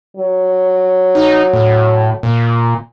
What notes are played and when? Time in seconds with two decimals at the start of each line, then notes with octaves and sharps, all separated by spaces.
0.16 F#3
1.15 D#4
1.53 A2
2.23 A#2